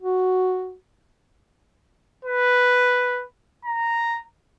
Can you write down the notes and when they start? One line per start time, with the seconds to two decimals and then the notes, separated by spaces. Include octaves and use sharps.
0.02 F#4
2.25 B4
3.65 A#5